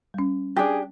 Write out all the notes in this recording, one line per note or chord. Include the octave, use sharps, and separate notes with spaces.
G3 C#4
D4 G4 G#4